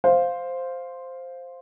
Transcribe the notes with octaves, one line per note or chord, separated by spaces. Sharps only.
C5 F5